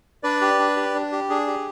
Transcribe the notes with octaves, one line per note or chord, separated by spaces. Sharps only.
D4 B4 D5
G4
D4
G4
D4
G4
D4 G#4
G4